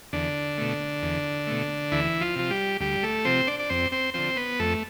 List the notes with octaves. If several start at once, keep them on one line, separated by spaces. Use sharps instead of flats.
E2 D3 D4
B2 A3
E2
B2 A3
D2 E3 E4
F3 F4
C3 F3
G3 G4
D2 G3 G4
A3 A4
C3 F3 C4 C5
D4 D5
D5
F2 C4 C5
C4 C5
D3 F3 C4 C5
B3 B4
F2 A3 A4